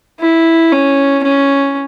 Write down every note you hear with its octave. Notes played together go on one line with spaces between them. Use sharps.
E4
C#4
C#4